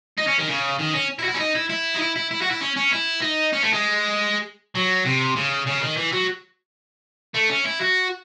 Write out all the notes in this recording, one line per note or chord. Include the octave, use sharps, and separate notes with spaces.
D#4
C#4
D#3
C#3
D#3
C#4
E4
F#4
E4
C#4
D#4
E4
E4
D#4
E4
E4
E4
F#4
E4
C#4
C#4
E4
D#4
C#4
A3
G#3
F#3
C3
C#3
C#3
D#3
E3
F#3
A3
C#4
E4
F#4